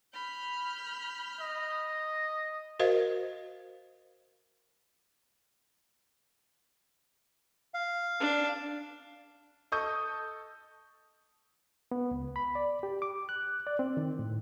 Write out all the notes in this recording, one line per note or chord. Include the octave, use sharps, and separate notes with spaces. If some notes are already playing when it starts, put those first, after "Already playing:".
B5 F6 G6
D#5
F#4 A#4 C5 D#5 F5
F5
D4
A4 D#5 C#6 D#6 G6
B3
C#2
B5
D5
G4
D6
F#6
D5
C4
D#3
A2